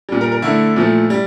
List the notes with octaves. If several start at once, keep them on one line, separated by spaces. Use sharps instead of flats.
A#2 G3
A#4
A#4
D3 A3 E4
A#2 F3 A3
G3